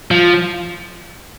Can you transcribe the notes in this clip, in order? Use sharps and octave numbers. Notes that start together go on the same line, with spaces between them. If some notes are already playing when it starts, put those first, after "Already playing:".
F3